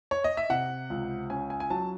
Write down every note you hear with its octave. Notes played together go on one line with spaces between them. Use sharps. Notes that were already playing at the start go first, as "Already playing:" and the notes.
C#5
D#5
E5
C3 F#5
C#2
C#4 G#5
G#5
G#5
F#3 A5